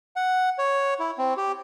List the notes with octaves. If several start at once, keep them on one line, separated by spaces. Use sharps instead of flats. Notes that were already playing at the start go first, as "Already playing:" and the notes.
F#5
C#5
E4
C4
G4